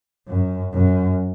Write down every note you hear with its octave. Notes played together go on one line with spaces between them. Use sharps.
F#2
F#2